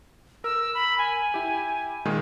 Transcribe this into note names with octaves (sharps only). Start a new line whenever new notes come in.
A#4 E6
B5
G#5
E4 G4
A#2 D#3 G#3